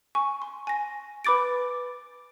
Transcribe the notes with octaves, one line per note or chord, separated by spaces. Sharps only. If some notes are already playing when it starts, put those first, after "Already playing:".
G#5 C#6
C6
G#5 A#6
B4 B5 D6 A6 D7